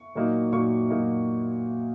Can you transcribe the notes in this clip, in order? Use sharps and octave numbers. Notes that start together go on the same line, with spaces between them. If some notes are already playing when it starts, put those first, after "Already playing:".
Already playing: C#6
A#2 F#3 A#3 D#4
A#2 F#3 A#3 D#4 C#6
A#2 F#3 A#3 D#4